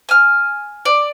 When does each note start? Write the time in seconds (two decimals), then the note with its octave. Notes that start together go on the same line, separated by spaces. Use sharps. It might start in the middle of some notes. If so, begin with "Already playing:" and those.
0.09 G#5 F6
0.85 D5